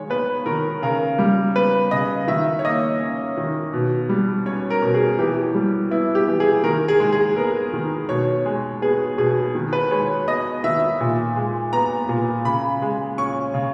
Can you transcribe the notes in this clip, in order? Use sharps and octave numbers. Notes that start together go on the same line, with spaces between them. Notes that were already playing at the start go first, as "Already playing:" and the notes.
Already playing: D#3 G#3 C#5
B3 B4
D#3 A#4
C#3 A#4
G3
B3 B4
C#3 D#5
D#3 E5
C#5
A#3 D#5
C#4
D#3
B2
G3
C#4 C#5
A#4
B2
G#4
E3 G4
G3
B3 E4
G4
E3
G#4
D#3 A#4
G#4
G#3
G#4
B3 A#4
D#3
B2 C#5
G#3
B3 G#4
B2 G#4
D#3
B4
G#3 C#5
B3 D#5
D#3 E5
A#2
G#3
B3 A#5
A#2
C#3 B5
G#3
C#4 C#6
C#3